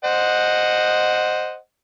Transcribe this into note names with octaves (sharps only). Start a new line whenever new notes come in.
C5 D#5 F#5